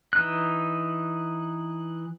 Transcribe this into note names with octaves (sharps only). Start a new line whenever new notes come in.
E3 D#4 F#6